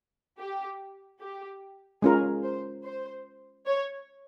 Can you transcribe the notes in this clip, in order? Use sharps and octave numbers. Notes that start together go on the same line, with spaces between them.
G4
G4
G#3 C#4 F4 G#4 A#4
C5
C5
C#5